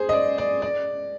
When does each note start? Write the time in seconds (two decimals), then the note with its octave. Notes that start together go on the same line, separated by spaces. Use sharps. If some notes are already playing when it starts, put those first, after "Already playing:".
Already playing: G#4 C5
0.09 D#5
0.13 D5
0.38 D5
0.62 D5